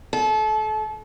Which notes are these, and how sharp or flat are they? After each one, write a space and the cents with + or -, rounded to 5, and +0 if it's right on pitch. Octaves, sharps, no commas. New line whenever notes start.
A4 -30